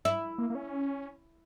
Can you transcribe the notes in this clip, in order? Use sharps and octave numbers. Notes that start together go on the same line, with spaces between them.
E4
A#3
A#3
C#4